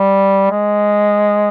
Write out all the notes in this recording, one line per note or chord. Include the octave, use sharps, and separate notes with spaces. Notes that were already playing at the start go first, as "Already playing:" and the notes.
Already playing: G3
G#3